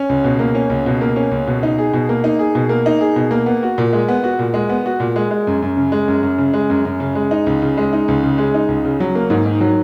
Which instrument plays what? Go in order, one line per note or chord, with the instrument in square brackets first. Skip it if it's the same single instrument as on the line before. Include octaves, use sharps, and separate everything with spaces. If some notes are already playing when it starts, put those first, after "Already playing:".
Already playing: [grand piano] C#4
C#2
B2
A#3
C#4
C#2
B2
A#3
C#4
C#2
B2
D#4
G#4
B2
A#3
D#4
G#4
B2
A#3
D#4
G#4
B2
A#3
B3
F#4
A#2
G#3
B3
F#4
A#2
G#3
B3
F#4
A#2
G#3
G#3
F#2
F#2
C#3
G#3
F#2
F#2
C#3
G#3
F#2
F#2
C#3
G#3
D#4
C#2
C#3
G#3
D#4
C#2
C#3
G#3
D#4
C#2
C#3
F#3
A#3
G#2
D#3
F#3